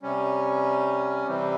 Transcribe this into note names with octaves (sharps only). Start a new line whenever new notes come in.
C3 G3 C#4
C3 E3 G3 C4